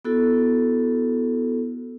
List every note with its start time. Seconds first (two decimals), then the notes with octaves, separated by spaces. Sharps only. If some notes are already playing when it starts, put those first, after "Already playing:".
0.05 B3 E4 F#4 A4